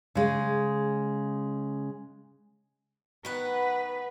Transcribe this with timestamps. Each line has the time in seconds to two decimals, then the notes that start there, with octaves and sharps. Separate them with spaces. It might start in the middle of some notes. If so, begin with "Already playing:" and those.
0.15 C#3 G#3
3.25 D#3 B3 B4 F#5